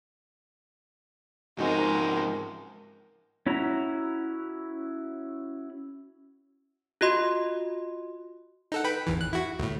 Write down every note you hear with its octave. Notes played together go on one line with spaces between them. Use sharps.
G#2 F3 G#3 C4 D#4 F#4 A#4
C#4 E4 F#4 A#5
F4 F#4 D#5 C6
D#4 A4 F#5
B4 G5 B5
G#1 E2 E3
F#6
E4 F#4
D2 A2